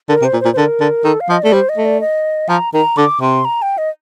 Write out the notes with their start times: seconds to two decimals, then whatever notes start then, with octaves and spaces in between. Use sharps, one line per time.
0.09 D3 A#4
0.22 C3
0.25 C5
0.33 A#2
0.41 C5
0.45 A#2
0.53 C5
0.57 D3 A#4
0.80 D3
1.04 D#3 A4
1.20 F5
1.29 F3 D#5
1.43 A3 D5
1.53 G3 C5
1.69 D#5
1.78 A3
1.85 D5
2.01 D#5
2.49 F3 A#5
2.74 D#3 A#5
2.97 D3 D6
3.21 C3 C6
3.45 A#5
3.62 G5
3.78 D#5